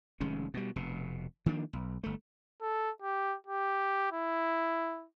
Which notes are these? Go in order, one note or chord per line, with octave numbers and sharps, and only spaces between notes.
F1 D#3 G#3 C#4
B2 G3
F1 B2
D#3 F3 A#3 D4
B1
G1 A3
A4
G4
G4
E4